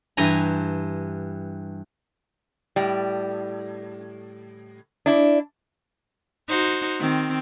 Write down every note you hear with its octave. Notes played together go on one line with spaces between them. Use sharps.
G2 E3 G#5 A#5
A2 G3
D4 E4
D#4 F#4 C5
D#3 C4